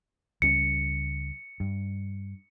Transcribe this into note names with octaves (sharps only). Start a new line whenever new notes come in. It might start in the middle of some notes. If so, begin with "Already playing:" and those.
C#2 G3 C#4 C#7
G2